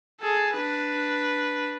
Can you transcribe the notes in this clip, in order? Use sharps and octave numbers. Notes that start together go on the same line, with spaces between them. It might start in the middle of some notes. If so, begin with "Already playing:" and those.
G#4 A4
D4 B4